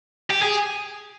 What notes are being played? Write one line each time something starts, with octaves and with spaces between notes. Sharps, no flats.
G4
G#4